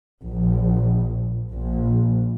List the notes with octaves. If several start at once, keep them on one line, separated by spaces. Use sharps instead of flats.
A#1
A#1